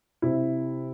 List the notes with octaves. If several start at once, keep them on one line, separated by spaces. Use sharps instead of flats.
C3 E4